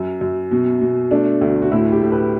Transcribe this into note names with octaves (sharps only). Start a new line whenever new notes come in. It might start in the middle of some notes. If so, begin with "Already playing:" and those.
Already playing: F#2
F#2
B2
B2
A3 D4
D2
F#4
A2 E4
G4
A2
B4